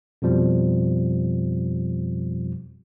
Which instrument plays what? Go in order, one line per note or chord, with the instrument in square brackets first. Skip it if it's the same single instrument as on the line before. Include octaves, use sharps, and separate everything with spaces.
[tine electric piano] F2 B2 F3 G3